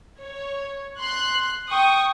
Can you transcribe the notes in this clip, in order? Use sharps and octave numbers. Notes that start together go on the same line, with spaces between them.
C#5
C6 F#6
G5 C#6 D#6